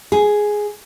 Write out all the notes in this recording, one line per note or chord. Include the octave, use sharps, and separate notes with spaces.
G#4